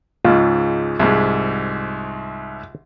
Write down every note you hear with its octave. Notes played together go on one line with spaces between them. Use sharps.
C#2 G#2 F4
C2 G#2